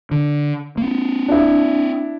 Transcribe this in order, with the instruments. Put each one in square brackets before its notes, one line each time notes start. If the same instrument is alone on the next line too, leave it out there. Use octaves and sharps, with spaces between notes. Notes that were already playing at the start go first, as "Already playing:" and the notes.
[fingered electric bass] D3
A#3 C4
[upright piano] D4 E4